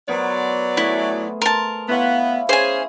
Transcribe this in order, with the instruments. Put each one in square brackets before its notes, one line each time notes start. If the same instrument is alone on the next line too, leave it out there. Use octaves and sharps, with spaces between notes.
[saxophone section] F#3 D5 [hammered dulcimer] B3 A#4 C5
[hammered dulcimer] A3 G#4 [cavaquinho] E4
[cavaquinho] A#4 A5 [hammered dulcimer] C6
[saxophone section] B3 [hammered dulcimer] E4 C#5 F5
[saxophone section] C#4 G#4 [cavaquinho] C5 G#5